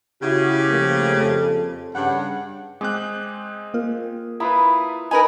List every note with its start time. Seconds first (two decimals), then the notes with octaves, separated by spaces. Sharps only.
0.22 C#3 E4 F#4 G4
0.68 F3 A3 A#3
1.17 F2 A4
1.94 G2 C#3 F#5
2.81 G#3 C4 G#4 D6 F#6 G6
3.74 A#3 F4 A#4
4.40 E4 F4 B4 A#5 B5 D#6
5.11 D#4 A#4 B4 G#5 A#5